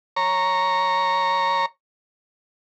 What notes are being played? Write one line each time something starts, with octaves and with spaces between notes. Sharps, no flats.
C#5 A#5